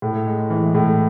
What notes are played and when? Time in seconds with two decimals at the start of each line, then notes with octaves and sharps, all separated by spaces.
0.02 A2
0.26 G#3
0.50 E3
0.75 A2